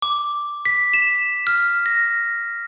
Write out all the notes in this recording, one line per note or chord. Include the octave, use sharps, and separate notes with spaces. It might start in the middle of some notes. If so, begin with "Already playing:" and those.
D6
B6
E7
F6
A#6